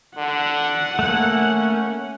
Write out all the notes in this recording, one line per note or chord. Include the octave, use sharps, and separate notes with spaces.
D3 F#5
A3 A#3 C#4